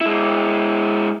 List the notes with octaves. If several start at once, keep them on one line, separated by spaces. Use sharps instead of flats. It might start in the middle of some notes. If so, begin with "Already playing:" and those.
G#3 E4